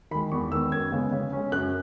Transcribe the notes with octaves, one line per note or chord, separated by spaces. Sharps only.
D#3 G#3 B5
E2 C#6
D#3 G#3 B3 E6
F#2 G#6
C#3 G#3 B3
C#3
G#3 C#4
F#2 F#6